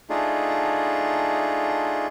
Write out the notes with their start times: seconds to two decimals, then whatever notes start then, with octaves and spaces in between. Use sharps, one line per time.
0.10 A3 D4 D#4 F4 G#4